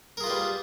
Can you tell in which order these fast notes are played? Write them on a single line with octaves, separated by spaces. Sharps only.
A#4 G#4 F4 B4 G3